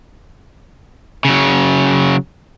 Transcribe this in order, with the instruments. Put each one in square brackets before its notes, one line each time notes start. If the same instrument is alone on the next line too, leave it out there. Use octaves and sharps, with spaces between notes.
[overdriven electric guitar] C#3 F#3